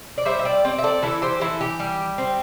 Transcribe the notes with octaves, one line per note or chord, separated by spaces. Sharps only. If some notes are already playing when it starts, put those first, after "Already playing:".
D5
G3 C5 E5
E5
D5 G5
C4 D5 G5
E5
A4 D5
E3 E4 A4
G4 C5
E3 E4 A4
G4
G3
C4